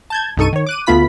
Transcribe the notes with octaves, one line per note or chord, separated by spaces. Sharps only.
A5 G6 G#6
C2 G2 D#4 A4 C#6 D#7
D#3 C#5
D6 F#6 D#7
D2 A3 B3 F4 B5 B6